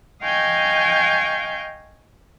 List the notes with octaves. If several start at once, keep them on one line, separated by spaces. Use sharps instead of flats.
D#5 F5 G5 G#5 C#6 G6